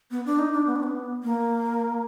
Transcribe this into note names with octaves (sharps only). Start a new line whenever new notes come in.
B3
D4
D#4
D4
B3
D4
B3
A#3